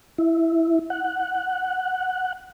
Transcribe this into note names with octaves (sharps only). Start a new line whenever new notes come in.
E4
F#5